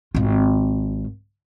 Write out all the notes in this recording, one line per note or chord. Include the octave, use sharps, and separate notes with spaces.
G#1 F4